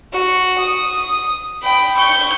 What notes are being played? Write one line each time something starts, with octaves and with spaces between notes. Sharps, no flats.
F#4
D#6
G5 B5
C#6 G6